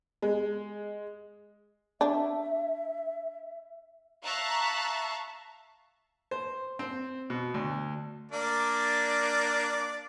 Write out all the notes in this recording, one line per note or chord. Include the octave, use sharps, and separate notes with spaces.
G#3
D4 E5
E5 F5 A5 A#5 C#6 F#6
C5
C4
B2
D2
A#3 D4 D5